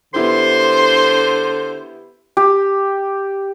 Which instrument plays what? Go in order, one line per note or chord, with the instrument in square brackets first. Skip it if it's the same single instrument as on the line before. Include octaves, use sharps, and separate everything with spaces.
[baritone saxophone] D3 [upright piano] B3 E4 G4 [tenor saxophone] C5 [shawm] C6
[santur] G4